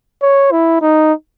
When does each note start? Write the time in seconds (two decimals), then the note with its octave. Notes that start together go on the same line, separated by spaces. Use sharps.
0.22 C#5
0.51 E4
0.82 D#4